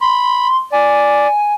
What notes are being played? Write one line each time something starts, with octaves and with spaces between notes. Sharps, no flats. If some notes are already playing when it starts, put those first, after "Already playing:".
B5 C6
D5 G#5